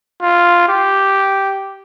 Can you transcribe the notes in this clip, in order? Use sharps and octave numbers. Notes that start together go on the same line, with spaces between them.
F4
G4